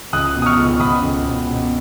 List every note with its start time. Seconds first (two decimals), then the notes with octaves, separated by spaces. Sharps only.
0.13 C#2 D#6 F#6
0.35 B2
0.42 D#6
0.46 C#6 F6
0.58 C#2
0.80 C#2 B5 D#6
1.02 C#2
1.25 B2
1.47 B2